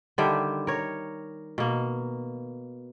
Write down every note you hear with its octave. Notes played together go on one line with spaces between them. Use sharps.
D3 D#3 G3 E5
A#4 C#5
B2 A#3